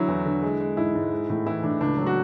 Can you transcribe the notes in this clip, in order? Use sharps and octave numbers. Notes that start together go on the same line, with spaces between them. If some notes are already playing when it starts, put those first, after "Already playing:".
Already playing: D3 F#3 E4
E2
D3
G#3
G#3
G#2 E4
G#2
G#3
A2
E3 E4
A2 D4
C#2 D4
F#3
F#4